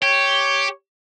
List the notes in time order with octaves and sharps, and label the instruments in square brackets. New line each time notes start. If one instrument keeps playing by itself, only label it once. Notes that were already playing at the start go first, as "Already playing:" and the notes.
[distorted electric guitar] G4 [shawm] C#5